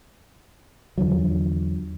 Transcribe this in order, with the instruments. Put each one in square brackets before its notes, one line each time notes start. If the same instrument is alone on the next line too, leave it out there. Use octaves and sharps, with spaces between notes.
[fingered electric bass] E2 D3 F3 F#3